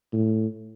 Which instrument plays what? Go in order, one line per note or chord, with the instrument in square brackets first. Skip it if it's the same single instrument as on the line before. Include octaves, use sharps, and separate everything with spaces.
[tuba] A2